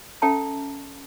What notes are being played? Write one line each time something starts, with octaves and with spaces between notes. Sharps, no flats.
C#4 A4 E5 G5 A5 A#5